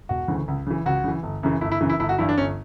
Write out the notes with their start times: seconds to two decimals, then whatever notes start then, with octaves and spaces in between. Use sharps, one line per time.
0.09 E1 F#4
0.28 D2 C#3 E3
0.48 C#2
0.67 C#3 E3
0.86 C#2 F#4
1.04 C#3 E3
1.23 G1
1.43 F#2 C#3 E3
1.61 G1 E4
1.72 E4
1.81 F#2 C#3 E3
1.89 E4
2.00 G1 E4
2.09 F#4
2.18 G2 E3 E4
2.29 D4
2.38 G1 C#4